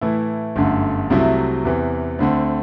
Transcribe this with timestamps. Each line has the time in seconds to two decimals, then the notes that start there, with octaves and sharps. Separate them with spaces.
0.01 A2 E3 A3 E4
0.56 G1 F#2 D3 A3
1.10 C2 C3 F#3 A3 E4
1.64 E2 C3 E3
2.19 D2 D3 A3 C4